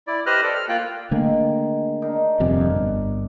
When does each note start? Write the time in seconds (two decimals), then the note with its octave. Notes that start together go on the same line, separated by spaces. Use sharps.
0.07 E4 D5
0.26 G4 B4 C5 D#5 F6 F#6
0.43 A4 D5
0.55 F6
0.69 A#3 F4 G5 F#6
1.11 D3 D#3 A3 A#3 G#4
2.02 D4 D#4 A#4
2.40 D#1 F2 C3 D5 G#5
2.70 G1